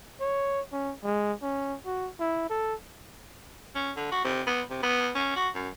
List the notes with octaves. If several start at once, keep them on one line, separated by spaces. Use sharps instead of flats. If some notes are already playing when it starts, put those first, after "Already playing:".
C#5
C#4
G#3
C#4
F#4
E4
A4
C#4
D3
F#4
C3
B3
C3
B3
C#4
F#4
F#2